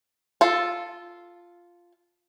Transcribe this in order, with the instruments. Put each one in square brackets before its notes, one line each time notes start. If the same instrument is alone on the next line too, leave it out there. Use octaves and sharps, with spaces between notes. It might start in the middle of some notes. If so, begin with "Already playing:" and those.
[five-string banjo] F4 A4